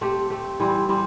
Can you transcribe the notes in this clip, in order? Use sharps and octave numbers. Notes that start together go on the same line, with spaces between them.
A3 C4 G4
A3 C4 G4
E3 G3 C4
E3 G3 C4